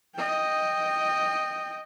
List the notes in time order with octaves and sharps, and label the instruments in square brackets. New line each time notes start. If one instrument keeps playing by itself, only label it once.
[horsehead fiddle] D#5 G5